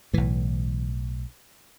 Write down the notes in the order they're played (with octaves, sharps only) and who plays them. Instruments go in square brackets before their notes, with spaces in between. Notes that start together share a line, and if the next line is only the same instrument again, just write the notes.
[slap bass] B1 A2 E3